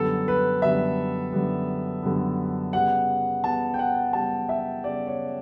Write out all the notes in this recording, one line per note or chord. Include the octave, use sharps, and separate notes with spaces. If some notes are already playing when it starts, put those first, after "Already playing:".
Already playing: F#2 D3 G3 B3 A4
B4
F#2 D3 G3 B3 E5
F#2 D3 G3 B3
F#2 D3 G3 B3
C#3 G3 B3 F#5
C#3 G3 B3 A5
G5
F#5
C#3 G3 B3 A5
E5
C#3 G3 B3 D5
C#5